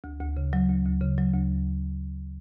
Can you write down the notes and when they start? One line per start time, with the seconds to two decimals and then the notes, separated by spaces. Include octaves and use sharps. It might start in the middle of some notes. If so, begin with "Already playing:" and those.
0.04 D2
0.20 D2
0.37 C#3
0.53 F#3
0.69 D2
0.85 D2
1.01 C#3
1.18 F#3
1.34 D2